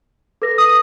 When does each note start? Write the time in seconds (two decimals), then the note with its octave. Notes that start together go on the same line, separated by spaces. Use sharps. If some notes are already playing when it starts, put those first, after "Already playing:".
0.42 A4 B4 A#6
0.58 D#6